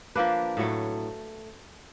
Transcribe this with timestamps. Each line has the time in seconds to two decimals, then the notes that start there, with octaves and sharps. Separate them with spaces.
0.15 F3 A#3 D4 B4
0.57 A2 F#3 A3